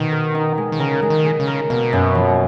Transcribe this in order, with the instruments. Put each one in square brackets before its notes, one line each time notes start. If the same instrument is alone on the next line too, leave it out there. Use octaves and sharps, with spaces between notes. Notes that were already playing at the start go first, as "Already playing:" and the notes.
Already playing: [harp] B2 [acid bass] D#3
[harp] A#4
D#4
G#3
[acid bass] D#3
[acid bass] C#3 [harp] A#4
[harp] G#3
[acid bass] D#3
[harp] G#3
[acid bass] C#3
[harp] A#4
[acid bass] B2 [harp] A#3
[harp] F#2
F3